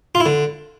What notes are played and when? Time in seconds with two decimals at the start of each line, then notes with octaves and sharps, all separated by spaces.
0.15 F4
0.20 E4
0.26 D3